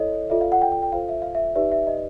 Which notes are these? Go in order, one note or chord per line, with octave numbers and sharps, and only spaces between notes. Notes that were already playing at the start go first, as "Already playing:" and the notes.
Already playing: E4 A4 C#5 D#5
F4 A4 D5 E5
F5
F#5
G5
G5
G5
F4 A4 C5 F5
E5
F5
E5
D#4 G4 B4 D5 E5
E5
D#5